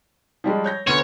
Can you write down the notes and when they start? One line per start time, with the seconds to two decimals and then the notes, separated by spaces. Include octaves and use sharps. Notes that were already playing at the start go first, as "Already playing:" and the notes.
0.44 F3 G3 G#3
0.64 C#5 G6 A#6
0.87 D2 B3 C#5 C#7